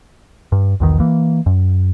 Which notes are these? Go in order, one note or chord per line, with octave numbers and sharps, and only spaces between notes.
G2
B1 E2 D#3
E3 A#3
F#2